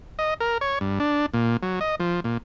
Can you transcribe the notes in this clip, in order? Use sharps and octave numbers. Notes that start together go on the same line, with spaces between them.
D#5
A#4
C#5
G2
D4
A#2
F#3
D#5
F3
A#2